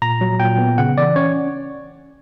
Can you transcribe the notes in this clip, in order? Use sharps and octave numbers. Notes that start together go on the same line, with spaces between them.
A#2 A#5
F#3
A#2 G5
B3
C#3 F#5
E3 D5
C#4 C#5